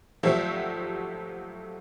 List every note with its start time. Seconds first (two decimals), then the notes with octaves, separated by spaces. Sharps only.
0.23 G#1 F3 F#3 A3 G4 E5